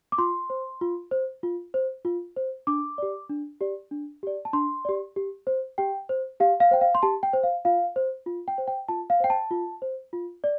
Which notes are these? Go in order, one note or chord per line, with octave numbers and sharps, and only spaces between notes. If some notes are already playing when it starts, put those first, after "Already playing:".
D6
F4 C6
C5
F4
C5
F4
C5
F4
C5
D4 D6
G4 D5
D4
G4 D5
D4
G4 D5
A5
D4 C6
G4 D5
G4
C5
G4 G5
C5
G4 F5
F5
C5 G5
F5
C6
G4 A5
G5
C5
F5
F4 F5
C5
F4
G5
C5
G5
F4 A5
F5
C5 G5
A5
F4
C5
F4
D5